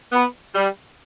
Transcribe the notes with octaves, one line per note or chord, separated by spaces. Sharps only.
B3
G3